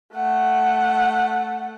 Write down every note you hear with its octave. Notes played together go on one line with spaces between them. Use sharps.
A3 F#5